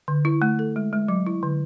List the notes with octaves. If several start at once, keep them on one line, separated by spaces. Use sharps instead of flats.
D3
E4
A3
A4
G#3
G#3
F#3
E4
D3